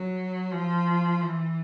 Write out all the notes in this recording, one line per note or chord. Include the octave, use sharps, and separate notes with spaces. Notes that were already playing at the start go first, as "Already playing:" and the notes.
Already playing: F#3
F3
E3